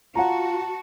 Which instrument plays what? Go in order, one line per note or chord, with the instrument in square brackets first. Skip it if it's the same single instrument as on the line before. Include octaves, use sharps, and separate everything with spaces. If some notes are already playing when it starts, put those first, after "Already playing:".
[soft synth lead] F4 [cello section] F#4 [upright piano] F#5 A#5 [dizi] A5